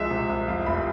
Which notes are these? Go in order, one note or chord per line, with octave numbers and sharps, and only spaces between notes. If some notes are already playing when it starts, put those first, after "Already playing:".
Already playing: C2 C3 F3 G#3 E5
C3
C2
F2 F5
F1 B5